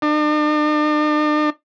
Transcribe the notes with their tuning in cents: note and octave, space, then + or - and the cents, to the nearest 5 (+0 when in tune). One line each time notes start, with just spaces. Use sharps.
D4 +45